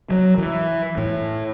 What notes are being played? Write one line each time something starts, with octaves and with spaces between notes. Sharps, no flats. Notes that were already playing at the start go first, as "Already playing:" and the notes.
F#3
E3
A2